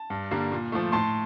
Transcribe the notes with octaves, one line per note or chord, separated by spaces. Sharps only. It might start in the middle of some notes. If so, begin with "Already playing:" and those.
Already playing: A5
G2
D3 G3 A#3
A#2
F3 A3
A2 A5 C6